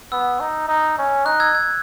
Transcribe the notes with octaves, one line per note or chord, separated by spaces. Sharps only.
B3 E6
D#4
D#4
C#4
D#4 F#6
E6 G#6
E6 G#6